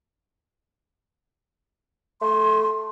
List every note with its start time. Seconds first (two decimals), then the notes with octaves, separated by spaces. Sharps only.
2.22 A3 C6